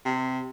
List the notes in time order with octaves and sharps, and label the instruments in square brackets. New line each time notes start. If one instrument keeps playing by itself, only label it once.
[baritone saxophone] C3